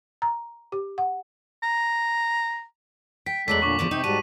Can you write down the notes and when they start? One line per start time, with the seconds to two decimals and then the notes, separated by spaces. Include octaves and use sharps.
0.22 A#5
0.72 G4
0.98 F#5
1.63 A#5
3.26 G5 B6
3.48 E2 F#3 G#3 A3 A4 D5 B6 F#7
3.62 A#2 D3 C#6 D6
3.79 E2 G#2 D3 F3
3.91 C3 D#4 G5
4.04 G#2 G3 F#4 A5 D#7